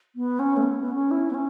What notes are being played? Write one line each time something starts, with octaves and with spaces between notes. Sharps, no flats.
B3
C#4
A3
B3
B3
C#4
E4
B3
C#4